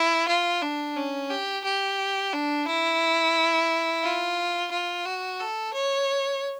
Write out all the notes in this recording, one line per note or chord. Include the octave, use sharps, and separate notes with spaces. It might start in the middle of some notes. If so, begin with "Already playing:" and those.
Already playing: E4
F4
D4
C#4
G4
G4
D4
E4
F4
F4
F#4
A4
C#5